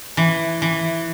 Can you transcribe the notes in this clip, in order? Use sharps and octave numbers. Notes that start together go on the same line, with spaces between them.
E3
E3